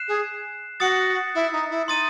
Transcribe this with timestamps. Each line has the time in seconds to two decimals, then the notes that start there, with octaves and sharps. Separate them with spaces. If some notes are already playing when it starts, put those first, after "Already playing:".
Already playing: F#6 C7 E7
0.08 G#4
0.80 F#4 D#6 A6 C#7
1.35 E4
1.52 D#4
1.70 E4
1.88 D#4 C6 D#6 A6 D#7